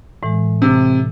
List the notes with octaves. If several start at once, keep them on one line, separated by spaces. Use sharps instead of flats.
A2 E3 G#3
C3